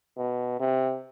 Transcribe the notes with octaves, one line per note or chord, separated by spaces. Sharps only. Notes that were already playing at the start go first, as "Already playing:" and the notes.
B2
C3